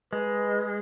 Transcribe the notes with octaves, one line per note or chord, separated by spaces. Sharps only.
G#3 B4